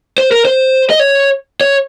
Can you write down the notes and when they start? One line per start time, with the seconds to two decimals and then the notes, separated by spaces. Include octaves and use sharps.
0.18 C5
0.32 A#4
0.45 C5
0.90 D#5
1.00 C#5
1.61 C#5